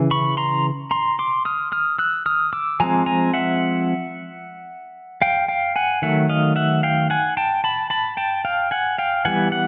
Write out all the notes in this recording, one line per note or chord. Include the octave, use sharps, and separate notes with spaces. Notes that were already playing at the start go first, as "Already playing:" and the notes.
Already playing: C#3 E3
B5 C#6
A#5 C6
A#5 C6
C6 D6
D#6 F6
D#6 F6
E6 F#6
D#6 F6
D6 E6
F3 G#3 C4 G#5 A#5
G#5 A#5
E5 F#5
F5 G5
F5 G5
F#5 G#5
D#3 F#3 A3 E5 F#5
D#5 F5
E5 F#5
F5 G5
F#5 G#5
G5 A5
A5 B5
A5 B5
G5 A5
F5 G5
F#5 G#5
F5 G5
E3 G3 B3 F#5 G#5
F#5